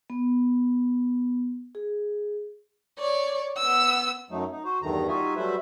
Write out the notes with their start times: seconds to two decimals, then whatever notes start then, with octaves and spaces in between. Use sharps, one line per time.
0.10 B3
1.75 G#4
2.99 C#5 D5
3.57 B3 E6
4.31 F#2 F#3 A3 D#4
4.51 D#4
4.65 F#4 C5
4.82 E2 G2 D#3 A3 A#5
5.08 G3 D#4 F4 F#4 E5 G#5
5.36 F#3 G3 A3 B4 C5 E5